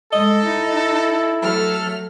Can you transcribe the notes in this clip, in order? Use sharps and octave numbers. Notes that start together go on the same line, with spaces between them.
G#3 A4 D#5
D#4 E4
F#3 A3 A4 F6